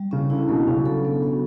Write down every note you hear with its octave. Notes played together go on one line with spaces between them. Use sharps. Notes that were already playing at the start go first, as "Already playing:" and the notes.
Already playing: G3
C#3 C#4
D3 E4
B2 F#3
C#3 D4
A4
B3
F#4